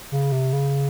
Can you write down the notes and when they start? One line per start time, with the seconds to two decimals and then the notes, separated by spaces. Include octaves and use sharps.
0.12 C#3
0.32 C3
0.53 C#3